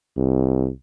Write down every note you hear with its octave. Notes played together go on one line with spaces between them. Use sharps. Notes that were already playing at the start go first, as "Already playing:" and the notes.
C2